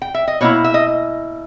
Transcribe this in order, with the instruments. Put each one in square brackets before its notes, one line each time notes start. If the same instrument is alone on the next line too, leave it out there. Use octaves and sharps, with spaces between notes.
[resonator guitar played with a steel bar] G5
E5
D#5
B2 A#3 E4 C#5
E5
D#5